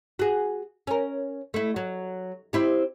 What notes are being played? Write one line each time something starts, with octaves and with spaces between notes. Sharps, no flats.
F#4 G#4
C#4 A#4
A3 E4
F#3
C4 E4 G4